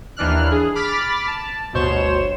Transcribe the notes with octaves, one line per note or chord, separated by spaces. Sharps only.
D#2 E3 D4 F6 F#6
G#4
B5 D6 F6 A6 B6
A5
G1 D2 B2 C5 C#5 E7